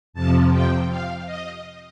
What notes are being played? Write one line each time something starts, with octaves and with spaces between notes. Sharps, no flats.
F2 C3 F3 A5
G5
F5
D#5